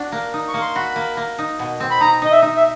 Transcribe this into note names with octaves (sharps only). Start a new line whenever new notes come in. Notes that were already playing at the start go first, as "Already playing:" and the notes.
Already playing: D4 F#4
A#3
D#4
C#6
A#3
C6
F#4 B5
A#3
A#3
D#4
B2
C4
B5
D#4 A#5
D#4 D#5
E5
D#4
E5